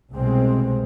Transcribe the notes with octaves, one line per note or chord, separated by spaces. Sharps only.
C2 B2 G#3 C4